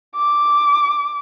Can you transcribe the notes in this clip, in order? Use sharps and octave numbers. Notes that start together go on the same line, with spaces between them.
D6